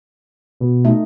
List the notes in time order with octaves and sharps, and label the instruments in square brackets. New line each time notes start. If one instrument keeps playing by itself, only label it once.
[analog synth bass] B2
[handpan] A3 D#4